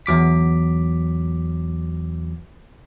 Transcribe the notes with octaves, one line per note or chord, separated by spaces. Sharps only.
E2 F#3 D6 B6